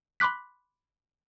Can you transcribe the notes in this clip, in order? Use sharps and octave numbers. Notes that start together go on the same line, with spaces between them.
B5 C6 D6 F#6 B6